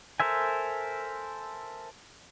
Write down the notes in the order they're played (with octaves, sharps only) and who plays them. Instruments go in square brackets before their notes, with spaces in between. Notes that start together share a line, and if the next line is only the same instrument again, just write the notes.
[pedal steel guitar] A4 A#4 C5 E5 G#5